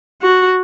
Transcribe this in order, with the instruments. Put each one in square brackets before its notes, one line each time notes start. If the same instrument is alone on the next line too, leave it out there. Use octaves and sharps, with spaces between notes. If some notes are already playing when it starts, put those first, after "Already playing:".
[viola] F#4